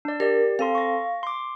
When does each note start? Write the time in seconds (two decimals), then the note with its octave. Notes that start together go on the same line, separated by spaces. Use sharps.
0.05 D4 D5
0.20 G4 A#4 D5
0.59 C4 A4 F5 C6
0.75 C#6 A#6
1.23 C6 D6